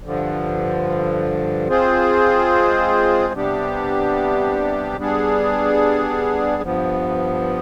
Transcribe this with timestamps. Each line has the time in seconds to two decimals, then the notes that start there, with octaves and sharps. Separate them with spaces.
0.04 G2 D3 F3
1.68 G#3 C4 F4 G#4 C5
3.33 C3 G3 B3 D4 G4
4.98 G3 B3 D4 G#4
6.63 G2 F3 B3